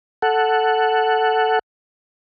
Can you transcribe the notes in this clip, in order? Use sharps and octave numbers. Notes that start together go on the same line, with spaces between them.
A4 F#5